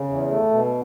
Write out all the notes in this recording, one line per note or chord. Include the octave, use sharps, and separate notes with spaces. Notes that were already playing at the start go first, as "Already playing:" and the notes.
Already playing: C#3
E2
A3
B2